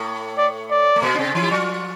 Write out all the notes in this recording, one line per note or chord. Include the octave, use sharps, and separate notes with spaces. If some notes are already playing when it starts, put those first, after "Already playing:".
Already playing: A2 A3
D5
D5
A3
A#2 A#3
D4
C3 C4
E3 E4
G4
F3 F4